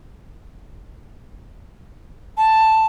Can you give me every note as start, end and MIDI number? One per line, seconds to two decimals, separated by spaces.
2.38 2.87 81